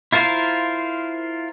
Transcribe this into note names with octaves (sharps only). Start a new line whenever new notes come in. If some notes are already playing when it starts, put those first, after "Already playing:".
E4 F4 A#4 C5 F5